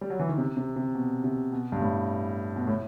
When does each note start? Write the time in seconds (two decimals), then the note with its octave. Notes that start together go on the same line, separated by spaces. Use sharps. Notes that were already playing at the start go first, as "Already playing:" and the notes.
0.01 G3
0.10 F#3
0.19 E3
0.29 D#3
0.38 C3
0.57 C3
0.76 C3
0.95 B2
1.24 C3
1.52 B2
1.72 G2
1.81 A2
2.56 B2
2.68 A2